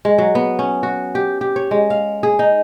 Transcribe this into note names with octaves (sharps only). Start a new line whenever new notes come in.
G#3
F#3
B3
C#4
F#4
G4
G4
C#5
G#3
F5
G#4
D#4